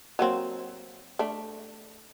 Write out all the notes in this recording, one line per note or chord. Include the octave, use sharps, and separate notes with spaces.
F#3 A#3 C4
A3 D4